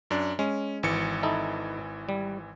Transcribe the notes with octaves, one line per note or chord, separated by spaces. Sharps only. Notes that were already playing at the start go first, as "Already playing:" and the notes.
F#2 D4
G#3 C#4
G#1 E3 C#7
D#4 E4 A4
G3